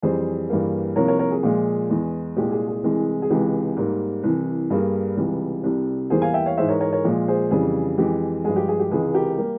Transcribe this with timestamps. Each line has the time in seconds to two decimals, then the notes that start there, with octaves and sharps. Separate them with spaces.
0.02 F2 E3 G3 G#4 C5
0.50 G2 E3 G3 A#3
0.96 C2 C3 F3 A#3 A#4 C#5
1.08 A#4 C#5
1.19 A#4 C#5
1.31 G#4
1.43 A#2 F3 G#3
1.90 E2 E3 G#3
2.36 C2 A#2 G#3 G4
2.51 G#4
2.68 G#4
2.83 C2 C3 E3 G#3
3.22 G#4
3.30 C#2 C3 E3 G#3 G4
3.77 G#2 G3 A#3
4.23 C2 C3 E3
4.70 G2 G3 A#3 G#4
5.17 C#2 C3 E3 G3
5.63 C2 C3 G3
6.10 E2 E3 G3 A#3 G#4 C5
6.22 F5 G#5
6.34 E5 G5
6.46 C#5 F5
6.57 G#2 E3 G#3 C5 E5
6.69 A#4 C#5
6.80 A#4 C#5
6.92 A#4 C#5
7.04 A#2 F3 G#3
7.28 G#4 C5
7.51 F2 C#3 E3 G3 G#4
7.98 F2 E3 G#3 G4
8.44 G2 F3 G#3 G#4
8.56 G4
8.68 G#4
8.80 G4
8.91 C#2 C3 E3 G#3 G#4
9.14 G4 A#4
9.38 G3 A#3